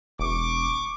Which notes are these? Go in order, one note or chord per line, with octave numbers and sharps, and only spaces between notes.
E1 C#6 D6